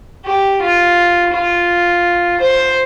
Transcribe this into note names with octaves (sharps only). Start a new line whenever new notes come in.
G4
F4
F4
C5